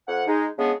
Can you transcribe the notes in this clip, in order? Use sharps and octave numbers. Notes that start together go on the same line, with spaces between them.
F2 F#5
G#3 D#4
C#3 G#3 B3 D4 G#4